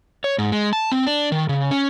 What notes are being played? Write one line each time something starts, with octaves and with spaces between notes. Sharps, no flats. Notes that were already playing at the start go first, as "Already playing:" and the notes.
C#5
G#2
G#3
A5
C4
D4
D#3
C#3
C#4